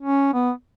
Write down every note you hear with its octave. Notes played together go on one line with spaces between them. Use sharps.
C#4
B3